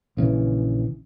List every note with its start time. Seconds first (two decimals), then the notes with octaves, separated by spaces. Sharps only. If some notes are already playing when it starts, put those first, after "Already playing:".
0.17 A#1 C#3 E3